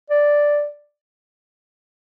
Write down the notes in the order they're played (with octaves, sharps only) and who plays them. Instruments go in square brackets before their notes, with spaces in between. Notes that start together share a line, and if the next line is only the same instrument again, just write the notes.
[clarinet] D5